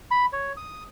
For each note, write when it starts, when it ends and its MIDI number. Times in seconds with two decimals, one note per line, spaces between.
0.11 0.26 83
0.33 0.53 73
0.57 0.84 87